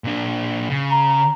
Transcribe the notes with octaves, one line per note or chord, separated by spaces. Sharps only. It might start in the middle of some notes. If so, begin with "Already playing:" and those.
A#2 D4
C#3
A#5